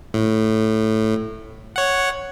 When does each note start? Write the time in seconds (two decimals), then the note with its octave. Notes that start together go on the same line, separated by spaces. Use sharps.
0.14 A2
1.76 C#5 F#5